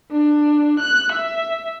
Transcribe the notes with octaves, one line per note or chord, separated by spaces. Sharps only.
D4
F#6
E5